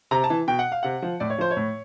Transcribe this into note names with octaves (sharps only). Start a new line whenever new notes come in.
C3 A#5
A5
E3
B2 G5
F#5
F5
C3 F#5
F3
A2 D5
C#5
F3 C5
C#5
A2